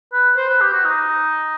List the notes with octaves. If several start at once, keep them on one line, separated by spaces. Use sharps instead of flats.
B4
C5
B4
G4
F#4
D#4